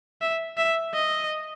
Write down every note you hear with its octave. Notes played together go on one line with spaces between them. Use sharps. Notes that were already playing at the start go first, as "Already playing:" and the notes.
E5
E5
D#5